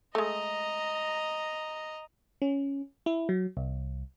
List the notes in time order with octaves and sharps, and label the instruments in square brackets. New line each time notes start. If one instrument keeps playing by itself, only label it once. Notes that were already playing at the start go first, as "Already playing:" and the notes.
[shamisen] G#3 A3 [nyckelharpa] D#5 A#5
[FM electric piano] C#4
E4
F#3
C2